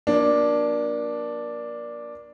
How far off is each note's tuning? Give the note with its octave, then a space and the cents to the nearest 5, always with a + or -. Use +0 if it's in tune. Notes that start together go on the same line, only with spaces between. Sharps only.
F#3 -30 A#3 +30 D4 +0